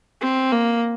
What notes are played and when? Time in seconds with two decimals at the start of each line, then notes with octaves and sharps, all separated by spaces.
0.21 C4
0.52 A#3